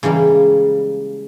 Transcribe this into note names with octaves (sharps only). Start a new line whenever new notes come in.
C#3 E3 G3 G#3 A#3